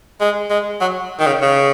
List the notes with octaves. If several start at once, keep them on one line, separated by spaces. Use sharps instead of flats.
G#3
G#3
F#3
D#3
C#3
C#3